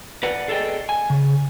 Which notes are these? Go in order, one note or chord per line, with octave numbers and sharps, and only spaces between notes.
B4 D5 F#5
G#4 A4 D5 D#5 G5
G#5
C#3